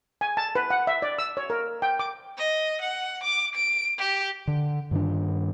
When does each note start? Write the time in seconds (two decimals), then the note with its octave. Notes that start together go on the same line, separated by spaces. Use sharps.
0.21 G#5
0.37 A5
0.55 B4
0.70 F#5
0.87 E5
1.02 D5
1.18 E6
1.37 C#5
1.50 A#4
1.82 G5
1.99 D6
2.38 D#5
2.81 F#5
3.23 D6
3.55 D7
3.98 G4
4.48 D3
4.91 G2 D#3 D4